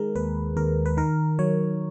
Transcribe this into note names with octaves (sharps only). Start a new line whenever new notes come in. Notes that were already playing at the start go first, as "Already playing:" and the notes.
Already playing: D#3 G#3 G#4 A#4
D#2 B4
D#2 A#4
B4
D#3 A#4
F#3 C#5